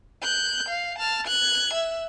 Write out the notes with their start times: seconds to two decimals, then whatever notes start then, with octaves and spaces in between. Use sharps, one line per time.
0.22 F#6 G6
0.69 F5
0.99 A5 F6
1.27 F#6 G#6
1.74 E5